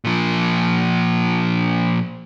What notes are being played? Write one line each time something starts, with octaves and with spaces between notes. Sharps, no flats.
A#2 F3